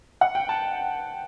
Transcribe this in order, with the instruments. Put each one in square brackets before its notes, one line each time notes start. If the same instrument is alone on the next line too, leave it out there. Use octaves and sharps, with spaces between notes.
[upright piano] F#5
G5
A5